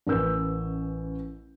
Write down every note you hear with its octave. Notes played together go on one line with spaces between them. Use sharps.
A1 C#4 A#4 B4 E6 G6